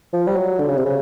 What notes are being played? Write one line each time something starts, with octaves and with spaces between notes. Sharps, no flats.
F3
G3
F#3
D3
C#3
C3
C#3